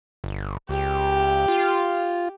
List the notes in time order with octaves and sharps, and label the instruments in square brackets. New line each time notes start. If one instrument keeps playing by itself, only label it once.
[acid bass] G1
[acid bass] C#2 [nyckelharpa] G4
[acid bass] F4